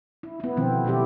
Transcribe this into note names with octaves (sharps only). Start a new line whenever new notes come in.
E4
B3 E4
B2 D3 D#3 F3 C4
B2 F#3 B3 E4 G4